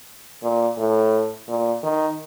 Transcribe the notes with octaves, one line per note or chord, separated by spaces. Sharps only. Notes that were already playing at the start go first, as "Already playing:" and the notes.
A#2
A2
A#2
D#3